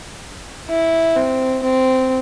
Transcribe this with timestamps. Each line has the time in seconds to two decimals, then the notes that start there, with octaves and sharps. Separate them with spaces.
0.69 E4
1.16 C4
1.62 C4